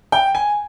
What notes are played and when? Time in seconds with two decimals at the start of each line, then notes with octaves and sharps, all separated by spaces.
0.12 G5
0.35 G#5